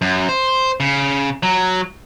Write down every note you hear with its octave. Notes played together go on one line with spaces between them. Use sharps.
F#2
C5
C#3
F#3